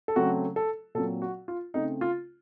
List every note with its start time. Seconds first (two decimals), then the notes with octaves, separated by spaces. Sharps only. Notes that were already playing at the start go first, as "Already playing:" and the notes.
0.08 A4
0.16 C#3 F#3 A3 C4 F#4
0.56 A4
0.95 A#2 F#3 C4 A4
1.22 F#4
1.48 F4
1.74 C#3 A3 C4 D#4
2.01 F4